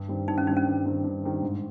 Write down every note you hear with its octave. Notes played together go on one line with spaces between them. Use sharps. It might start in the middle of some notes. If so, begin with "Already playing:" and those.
Already playing: G2
D#3 G3 C4
G2 D#4
C#4
D#3 G3 C4 D#4
C#4
G2
D#3 G3 C4
G2
D#3 G3 C4
G#2